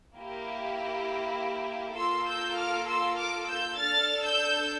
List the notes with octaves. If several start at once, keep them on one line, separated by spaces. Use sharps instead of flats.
A#3 E4 G4
A#3 F4 A4 C6 E6
E6 G6
D6 F6
C6 E6
D6 F6
E6 G6
D4 A4 F6 A6
E6 G6